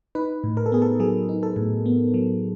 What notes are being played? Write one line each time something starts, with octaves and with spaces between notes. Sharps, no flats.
D#4 B4
A2
A#4
A4
B3 G#4
A4
F#3 G#4
D#4
A4
A2
B3
F#3